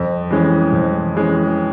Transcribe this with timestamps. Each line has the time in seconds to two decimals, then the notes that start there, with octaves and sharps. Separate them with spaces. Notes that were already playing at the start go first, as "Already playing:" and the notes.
Already playing: F2
0.30 E3 G#3 C#4
0.72 F2
1.14 E3 G#3 C#4